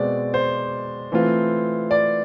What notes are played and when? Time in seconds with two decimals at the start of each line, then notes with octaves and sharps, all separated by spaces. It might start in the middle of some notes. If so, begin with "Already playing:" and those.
Already playing: B2 G#3 C4 D5
0.34 C5
1.12 E3 A3 C4 F4
1.91 D5